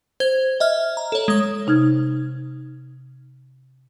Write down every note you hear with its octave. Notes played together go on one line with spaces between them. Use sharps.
C5 G#6
D#5 E5 F6
A#5
A4 C#5
G#3 D#6
C3 D#4 F6 G#6